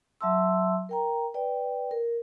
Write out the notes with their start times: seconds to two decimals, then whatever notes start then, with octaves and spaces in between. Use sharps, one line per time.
0.21 F#3 E5 A5 C6 E6
0.89 A#4 G5 A#5
1.34 B4 D5 G5
1.91 A#4